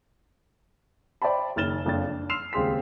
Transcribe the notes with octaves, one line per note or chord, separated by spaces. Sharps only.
C5 D5 E5 G5 A5 B5
F#1 D#3 F6 A6 E7 G7
F#1 F2 F3 D4 A6
D4
C6 E6 F6 C7 E7 F7
D#1 C#2 C4 G#4 C6 B6